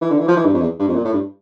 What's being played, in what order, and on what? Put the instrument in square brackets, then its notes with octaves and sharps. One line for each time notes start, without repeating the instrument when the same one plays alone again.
[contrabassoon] E3
D3
E3
F3
E3
G2
F2
E2
G2
F2
A#2
A2
G2